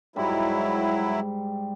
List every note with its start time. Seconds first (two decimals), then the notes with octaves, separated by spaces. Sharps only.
0.16 G#2 F#3 G3 E4 E5